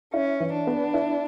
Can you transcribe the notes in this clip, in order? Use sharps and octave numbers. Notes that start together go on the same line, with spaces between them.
C#4 E4
E3
D4
B3
E4